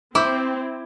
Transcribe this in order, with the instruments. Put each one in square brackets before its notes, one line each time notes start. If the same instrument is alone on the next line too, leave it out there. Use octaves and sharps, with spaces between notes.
[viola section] C4 [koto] E4 [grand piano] D6 G6